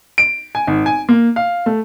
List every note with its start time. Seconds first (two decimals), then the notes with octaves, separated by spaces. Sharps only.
0.18 D7
0.55 G#5
0.67 G#1
0.86 G#5
1.09 A#3
1.36 F5
1.66 A3